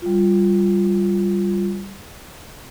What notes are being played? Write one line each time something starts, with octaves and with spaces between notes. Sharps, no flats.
G3 F4